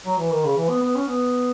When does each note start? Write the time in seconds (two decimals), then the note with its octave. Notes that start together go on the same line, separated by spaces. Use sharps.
0.06 F#3
0.19 E3
0.31 D#3
0.44 C#3
0.57 E3
0.69 B3
0.82 B3
0.95 C#4
1.07 B3